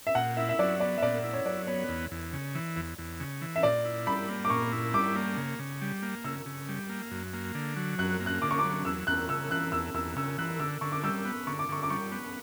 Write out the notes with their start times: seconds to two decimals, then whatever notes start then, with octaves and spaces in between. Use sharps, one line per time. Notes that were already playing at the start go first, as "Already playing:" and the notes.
0.07 E5
0.15 A#2 F#5
0.37 E4 E5
0.49 E5
0.59 F#3 D5
0.80 B3 D5
0.98 E5
1.02 A#2 D5
1.24 E4
1.33 C#5
1.45 F#3 D5
1.67 B3 C#5
1.89 E2
2.11 E2
2.33 C#3
2.55 E3
2.76 E2
2.98 E2
3.20 C#3
3.42 E3
3.56 E5
3.63 A#2 D5
3.85 E4
4.06 G3 B5
4.29 A#3
4.45 D6
4.50 A#2 C#6
4.72 E4
4.93 G3 D6
5.16 A#3
5.37 C#3
5.59 C#3
5.82 G3
6.03 A#3
6.24 C#3 E6
6.46 C#3
6.68 G3
6.89 A#3
7.11 F#2
7.33 A#3
7.55 D3
7.76 F#3
7.98 F#2 F#6
8.20 A#3
8.26 F#6
8.42 D3 D6
8.51 C#6
8.59 D6
8.64 F#3
8.85 E2 E6
9.07 E2 F#6
9.29 C#3 E6
9.51 E3 F#6
9.72 E2 E6
9.94 E2 E6
10.16 C#3 E6
10.38 E3 F#6
10.60 D3 E6
10.81 D3 C#6
10.92 D6
11.04 G3 E6
11.25 B3
11.47 D3 C#6
11.59 D6
11.69 D3 C#6
11.83 D6
11.90 G3 C#6
12.12 B3